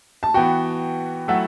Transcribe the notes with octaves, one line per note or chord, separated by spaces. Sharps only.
A5
E3 B3 F#4 G5
F#3 A3 E4 A4 E5 F#5